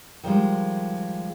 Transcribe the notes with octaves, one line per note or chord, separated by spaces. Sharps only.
D#3 F3 G3 G#3